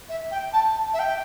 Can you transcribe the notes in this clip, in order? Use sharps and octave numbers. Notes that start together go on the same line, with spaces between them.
E5
G5
A5
E5
G5